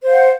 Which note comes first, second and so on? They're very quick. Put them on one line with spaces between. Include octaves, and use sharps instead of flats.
C5 F5 F#5